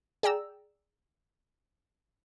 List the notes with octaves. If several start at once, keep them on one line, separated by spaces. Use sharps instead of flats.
G#4 D5 G5 A#5 E6